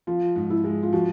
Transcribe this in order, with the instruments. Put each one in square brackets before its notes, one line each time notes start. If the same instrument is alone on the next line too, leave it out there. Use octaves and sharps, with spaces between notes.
[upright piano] F3 [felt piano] F4
[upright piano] G#2
[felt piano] E4
[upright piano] G#3
[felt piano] F4
[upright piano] F3 [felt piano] F#4